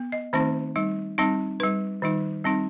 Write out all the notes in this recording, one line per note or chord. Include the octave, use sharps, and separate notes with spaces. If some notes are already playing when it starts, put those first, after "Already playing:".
Already playing: B3
D#5
D#3 A3 C4 D#4 C5
G3 D#4
G3 C4 D#4
G3 D#4 B4
D#3 G3 D#4
G3 C4 D#4